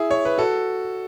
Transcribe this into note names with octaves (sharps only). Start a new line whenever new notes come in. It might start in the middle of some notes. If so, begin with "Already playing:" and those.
Already playing: E4 G#4
C#5
B4
F#4 A4